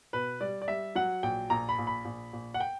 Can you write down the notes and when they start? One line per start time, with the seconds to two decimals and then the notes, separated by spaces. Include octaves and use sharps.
0.13 B2 B4
0.41 G3 D5
0.62 D5
0.68 G3 E5
0.95 F#3 F#5
1.23 A#1 G5
1.50 A#1 A#5
1.69 B5
1.78 A#1
1.87 B5
2.05 A#1
2.33 A#1
2.54 F#5
2.60 G5